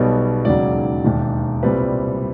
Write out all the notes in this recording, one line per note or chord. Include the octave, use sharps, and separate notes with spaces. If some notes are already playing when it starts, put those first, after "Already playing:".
Already playing: B1 B2 G3 B3 C#5
E1 D#2 C#3 F#3 D5
E1 D#2 D#3
C2 A#2 G3 C4 B4